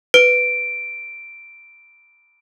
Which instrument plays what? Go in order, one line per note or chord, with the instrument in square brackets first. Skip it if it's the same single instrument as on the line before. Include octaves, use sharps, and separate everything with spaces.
[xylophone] B4 [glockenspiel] D7